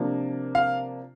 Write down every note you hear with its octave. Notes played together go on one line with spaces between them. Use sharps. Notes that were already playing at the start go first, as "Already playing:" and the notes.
Already playing: C3 F3 A#3 D4
F5